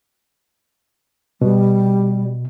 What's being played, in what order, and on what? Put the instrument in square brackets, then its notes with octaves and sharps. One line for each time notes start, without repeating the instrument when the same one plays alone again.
[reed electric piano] B2 [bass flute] G3